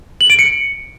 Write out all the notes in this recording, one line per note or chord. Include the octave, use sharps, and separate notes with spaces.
F#7
D7
C#7